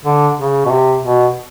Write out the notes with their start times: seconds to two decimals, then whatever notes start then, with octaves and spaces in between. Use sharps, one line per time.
0.05 D3
0.38 C#3
0.66 B2
0.71 C3
1.03 B2